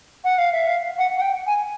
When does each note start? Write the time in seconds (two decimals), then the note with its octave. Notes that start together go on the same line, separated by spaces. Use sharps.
0.24 F#5
0.38 F5
0.52 E5
0.66 F5
0.98 F#5
1.18 F#5
1.21 G5
1.47 G#5